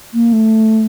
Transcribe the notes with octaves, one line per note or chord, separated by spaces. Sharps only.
A#3
A3